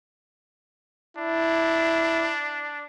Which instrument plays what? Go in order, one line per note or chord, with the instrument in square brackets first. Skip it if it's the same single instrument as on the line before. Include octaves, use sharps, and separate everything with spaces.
[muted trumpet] D4 [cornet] E4